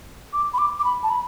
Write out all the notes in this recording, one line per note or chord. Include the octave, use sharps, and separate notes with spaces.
D6
B5
D6
D6
B5
A5
B5